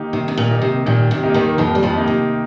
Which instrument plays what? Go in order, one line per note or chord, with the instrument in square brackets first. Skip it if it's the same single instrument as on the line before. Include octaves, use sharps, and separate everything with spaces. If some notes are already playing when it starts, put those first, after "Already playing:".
Already playing: [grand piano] D#3 A#3 D#4 G4
[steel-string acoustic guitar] C3 [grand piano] D#3
[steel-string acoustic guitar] C3
A#2
[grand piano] A#3 D#4 G4
[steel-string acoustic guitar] C3
[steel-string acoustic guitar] A#2 [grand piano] D#3
[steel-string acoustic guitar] C3
[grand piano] A#3 D#4 G4
[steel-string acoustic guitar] D#2 D#3
[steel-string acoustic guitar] F2 F3 [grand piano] D#3
[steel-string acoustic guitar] G3
F2 F3
[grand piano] A#3 D#4 G4
[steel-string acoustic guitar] C3